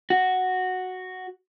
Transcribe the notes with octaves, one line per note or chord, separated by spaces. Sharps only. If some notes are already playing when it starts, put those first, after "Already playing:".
F#4